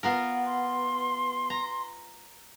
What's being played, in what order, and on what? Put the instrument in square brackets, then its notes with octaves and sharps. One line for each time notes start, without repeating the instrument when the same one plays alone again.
[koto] B3 F4 A#4
[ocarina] C6
[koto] A#5